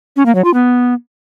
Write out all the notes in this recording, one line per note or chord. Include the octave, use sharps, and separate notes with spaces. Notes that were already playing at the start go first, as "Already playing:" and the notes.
C#4
A#3
F#3
F4
B3